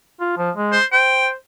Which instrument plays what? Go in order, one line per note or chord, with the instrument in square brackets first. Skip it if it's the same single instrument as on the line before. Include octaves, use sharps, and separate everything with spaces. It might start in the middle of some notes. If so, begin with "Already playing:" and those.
[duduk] F4
F3
G#3
[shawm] C5
[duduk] C5 [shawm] G5